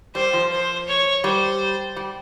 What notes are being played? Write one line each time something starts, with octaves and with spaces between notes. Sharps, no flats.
G3 C5
F3
C5
C#5
G3 C5
G3